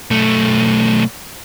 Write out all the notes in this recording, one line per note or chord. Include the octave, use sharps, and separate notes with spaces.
B1 A3